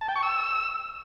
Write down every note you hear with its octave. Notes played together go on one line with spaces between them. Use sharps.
A5
G5
C#6
E6